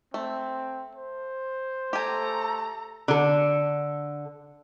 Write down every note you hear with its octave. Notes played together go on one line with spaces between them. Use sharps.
A3 C4
C5
A3 G4 A4 G#5 A#5
D3 A4